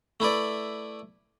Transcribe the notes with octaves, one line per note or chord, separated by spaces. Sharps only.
A3 E4 B4 D5